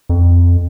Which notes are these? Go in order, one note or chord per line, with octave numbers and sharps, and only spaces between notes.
F2